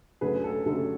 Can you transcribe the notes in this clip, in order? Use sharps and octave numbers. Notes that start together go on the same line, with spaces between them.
F#2 D3 F#3 A3 G#4 B4
A4
F#2 D3 F#3 A3 A4